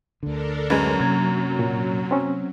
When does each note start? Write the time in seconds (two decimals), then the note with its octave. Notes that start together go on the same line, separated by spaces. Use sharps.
0.23 D2 D3 D4 A4 A#4
0.70 F#2 F#3 G#3 B4 G#6
1.00 C3 A#3 A#5 G#6
1.59 A#2
2.11 C4 C#4